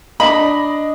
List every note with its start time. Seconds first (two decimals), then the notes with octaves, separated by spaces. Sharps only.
0.20 D4 D#5 B5